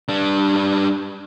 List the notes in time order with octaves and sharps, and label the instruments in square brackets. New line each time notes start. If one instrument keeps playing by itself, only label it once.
[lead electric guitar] G3 D4